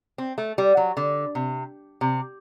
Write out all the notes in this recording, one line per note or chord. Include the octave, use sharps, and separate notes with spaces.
C4
A3
G3
F#3
D3
C3
C3